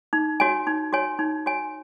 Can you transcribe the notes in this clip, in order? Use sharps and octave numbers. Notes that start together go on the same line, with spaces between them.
D#4
F#4 C#5 G#5
D#4
F#4 C#5 G#5
D#4
F#4 C#5 G#5